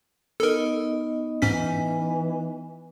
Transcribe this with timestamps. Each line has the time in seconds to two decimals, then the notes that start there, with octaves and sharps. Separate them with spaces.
0.40 B3 D#4 A4 A#4 D#5
1.42 G#2 E3 C#4 B6